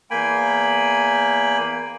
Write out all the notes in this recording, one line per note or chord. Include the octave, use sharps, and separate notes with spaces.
E2 A#3 G5 G#5 B5